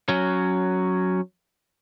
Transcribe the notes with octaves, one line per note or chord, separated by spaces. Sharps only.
F#3 C#4